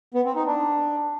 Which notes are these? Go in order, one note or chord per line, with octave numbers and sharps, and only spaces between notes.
B3
C4
D#4
D4